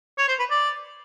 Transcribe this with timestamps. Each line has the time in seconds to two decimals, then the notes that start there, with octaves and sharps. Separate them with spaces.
0.18 C#5
0.28 C5
0.39 B4
0.50 D5